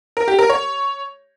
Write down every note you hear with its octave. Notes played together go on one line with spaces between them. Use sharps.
A#4
G4
A#4
C#5